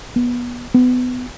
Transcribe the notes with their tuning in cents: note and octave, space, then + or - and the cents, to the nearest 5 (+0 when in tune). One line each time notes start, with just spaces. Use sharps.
B3 -25
B3 +25